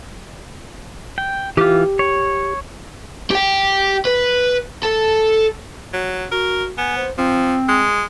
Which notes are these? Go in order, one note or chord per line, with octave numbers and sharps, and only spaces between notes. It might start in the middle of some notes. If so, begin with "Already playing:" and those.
G5
E3 F4 G4
C#5
G4 G5
B4
A4
F#3
F#4 A#4
B3 G#5
C5
F3 C4
G#3